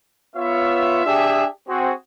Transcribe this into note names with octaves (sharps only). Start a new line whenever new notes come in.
B3 F4 C#5 E5
D4 G4 G#4 E5
C4 F#4 G#4